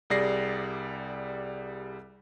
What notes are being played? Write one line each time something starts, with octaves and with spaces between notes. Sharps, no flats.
C2 G3 G#4 D5 A#6 C7